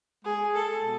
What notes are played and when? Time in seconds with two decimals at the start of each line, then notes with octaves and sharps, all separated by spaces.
0.25 G#3 G#4
0.54 A4
0.83 B2